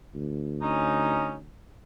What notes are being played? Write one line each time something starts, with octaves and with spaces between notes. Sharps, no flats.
D2
C#4 D#4